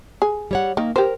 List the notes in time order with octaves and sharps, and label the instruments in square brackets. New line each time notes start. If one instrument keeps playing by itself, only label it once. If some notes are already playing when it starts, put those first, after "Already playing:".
[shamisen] G#4
[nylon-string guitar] G3 C#5 F#5
[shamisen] D#3 [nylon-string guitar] A#3
[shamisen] G4 C5 [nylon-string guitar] A#4